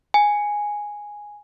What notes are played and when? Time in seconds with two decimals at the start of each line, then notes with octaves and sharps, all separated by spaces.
0.14 G#5